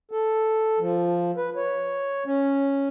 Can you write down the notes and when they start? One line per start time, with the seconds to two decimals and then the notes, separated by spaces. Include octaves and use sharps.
0.11 A4
0.79 F3
1.37 B4
1.56 C#5
2.26 C#4